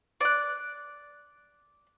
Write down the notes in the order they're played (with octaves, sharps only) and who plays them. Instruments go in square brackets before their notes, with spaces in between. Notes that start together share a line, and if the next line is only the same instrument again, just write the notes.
[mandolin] D5 F#6